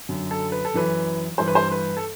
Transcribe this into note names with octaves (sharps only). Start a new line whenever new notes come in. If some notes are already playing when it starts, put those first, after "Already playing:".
F#2 D3
A4
B4
A4
F#2 E3 B4
G2 E3 C5
B4
C5
B4
A4